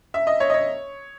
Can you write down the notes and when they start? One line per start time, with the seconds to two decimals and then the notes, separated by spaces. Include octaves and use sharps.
0.14 E5
0.27 D#5
0.40 C#5
0.50 D#5
0.54 C#5